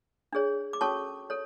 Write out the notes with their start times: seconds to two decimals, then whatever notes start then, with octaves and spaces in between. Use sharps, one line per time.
0.33 D4 G#4 C#5
0.73 D6
0.81 C#4 F#4 A4 C#5 A5 C#6
1.30 A4 C#5